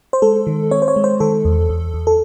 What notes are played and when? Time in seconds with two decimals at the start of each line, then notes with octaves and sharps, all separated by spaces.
0.13 C5
0.22 G#3 A4
0.47 D#3
0.71 C4 C#5
0.82 C5
0.88 C#5
0.96 G#3
1.04 C5
1.20 D#3 A4
1.45 E2
1.69 E2
1.94 E2
2.07 A4